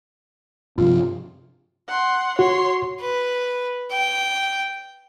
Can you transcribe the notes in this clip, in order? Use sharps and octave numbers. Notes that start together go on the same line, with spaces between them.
G2 C3 F3 F4
F#5 C6
F#4 C#5 C6
B4
G5